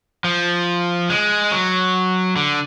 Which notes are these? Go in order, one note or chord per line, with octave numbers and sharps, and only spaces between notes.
F3
G#3
F#3
D3